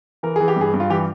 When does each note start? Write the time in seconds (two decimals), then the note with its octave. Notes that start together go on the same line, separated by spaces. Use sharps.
0.23 E3 A#4
0.36 E3 G#4
0.48 G4
0.56 G2 G#4
0.74 G2
0.80 F4
0.90 E3 G4